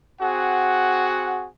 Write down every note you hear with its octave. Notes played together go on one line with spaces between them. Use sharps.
C4 F#4 G#4 F#5